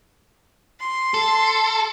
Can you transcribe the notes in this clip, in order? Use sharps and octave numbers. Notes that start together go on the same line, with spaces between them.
C6
A4